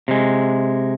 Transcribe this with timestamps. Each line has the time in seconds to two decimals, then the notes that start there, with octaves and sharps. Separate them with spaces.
0.08 C3 G#3